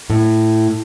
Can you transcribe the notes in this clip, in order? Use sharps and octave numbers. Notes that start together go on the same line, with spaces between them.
A2